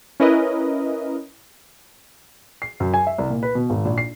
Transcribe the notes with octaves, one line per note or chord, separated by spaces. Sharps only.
C#4 E4 A#4 B4 D#5
C7
F#2
G#5
E5
C2
A#2
B4
B2
G#1
A#1
C7